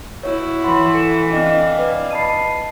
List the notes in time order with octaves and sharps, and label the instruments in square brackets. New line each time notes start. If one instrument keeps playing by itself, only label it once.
[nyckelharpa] E4 F#4 [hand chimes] C#5
[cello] E3 [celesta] F#5 B5 C6
[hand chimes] A4 [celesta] C#7 E7
[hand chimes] C4 G5 [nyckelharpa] D4 F5 [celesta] D#5
[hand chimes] B4 D5
[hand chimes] D#5 A5 B5 [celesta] C7 D#7